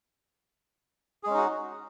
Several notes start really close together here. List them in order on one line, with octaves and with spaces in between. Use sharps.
G#4 G#3 C#4 D#4 F#4